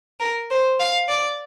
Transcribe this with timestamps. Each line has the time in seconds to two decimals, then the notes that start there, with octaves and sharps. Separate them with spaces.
0.20 A#4
0.50 C5
0.80 F5
1.09 D5